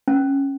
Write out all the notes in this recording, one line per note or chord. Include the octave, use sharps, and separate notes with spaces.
C#4